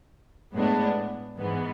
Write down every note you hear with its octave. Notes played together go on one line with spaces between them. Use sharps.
A2 G#3 B3 D4
G#2 E3 B3